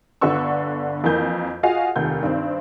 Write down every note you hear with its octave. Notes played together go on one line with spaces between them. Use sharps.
G1 D3 B3 D4 C#6 E6
F2 E3 A#3 G6
F4 F#4 G#4 D#5 F5
F1 D#2 G6
G2 D#3 C4